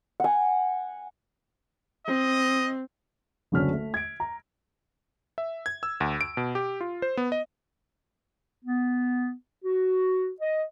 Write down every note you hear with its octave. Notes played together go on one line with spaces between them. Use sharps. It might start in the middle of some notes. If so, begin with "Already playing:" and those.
F#5 G#5
C4 D#5
F#1 D2 D3 C#4 F6 B6
A3
G#6 D7
A#5
E5
G#6
E6
D2
D7
B2
G4
F4
C5
B3
D#5
B3
F#4
D#5